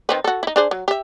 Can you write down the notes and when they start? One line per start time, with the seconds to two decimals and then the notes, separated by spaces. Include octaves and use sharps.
0.09 D#3 C4 B4
0.24 F#4 A4
0.43 D#4 E4
0.56 D4 G#4 C5
0.71 F#3
0.88 G4 E5